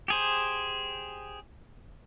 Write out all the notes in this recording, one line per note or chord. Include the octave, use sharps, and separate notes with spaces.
G4 G#4 C5